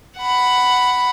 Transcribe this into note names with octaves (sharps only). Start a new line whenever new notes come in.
F#5 B5